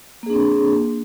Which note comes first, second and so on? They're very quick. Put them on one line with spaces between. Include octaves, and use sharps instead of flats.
A#3 G#4 D4 C4